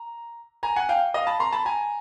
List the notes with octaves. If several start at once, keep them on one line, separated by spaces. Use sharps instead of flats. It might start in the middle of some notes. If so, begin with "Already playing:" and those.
Already playing: A#5
G#5 A#5
F#5 G#5
F5 G5
D#5 F5
A5 B5
A#5 C6
A5 B5
G#5 A#5